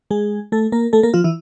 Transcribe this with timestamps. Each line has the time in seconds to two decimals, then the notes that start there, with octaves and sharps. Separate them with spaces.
0.11 G#3 G#4
0.52 A3 A4
0.72 A#3 A#4
0.93 A3 A4
1.03 A#3 A#4
1.14 F3 F4
1.24 E3 E4